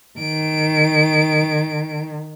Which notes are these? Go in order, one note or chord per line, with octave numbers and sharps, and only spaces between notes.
D#3 D7